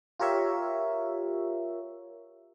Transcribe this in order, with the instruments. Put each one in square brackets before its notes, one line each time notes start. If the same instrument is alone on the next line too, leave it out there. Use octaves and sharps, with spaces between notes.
[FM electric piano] F4 G4 A#4 C#5 E5